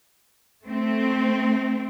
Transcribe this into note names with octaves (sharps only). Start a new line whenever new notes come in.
A3 C4